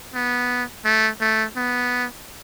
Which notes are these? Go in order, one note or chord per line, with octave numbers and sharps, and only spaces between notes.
B3
A3
A3
B3